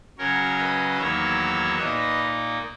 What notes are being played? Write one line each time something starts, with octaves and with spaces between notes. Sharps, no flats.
C#3 F#3 C#4 A#4 C#5
B4 D#5
E2 D#3 F#3 A#3 C#5 E5
A#2 A#3 D#4 B4 D#5